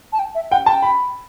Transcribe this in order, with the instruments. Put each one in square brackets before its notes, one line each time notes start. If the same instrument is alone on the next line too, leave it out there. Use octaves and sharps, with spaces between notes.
[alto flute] A5
G5
E5
[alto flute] F#5 [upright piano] G5
[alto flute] G5 [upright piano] A5
[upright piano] B5